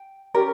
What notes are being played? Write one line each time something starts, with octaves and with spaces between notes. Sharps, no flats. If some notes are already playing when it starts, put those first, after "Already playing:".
Already playing: G5
C#4 G4 A#4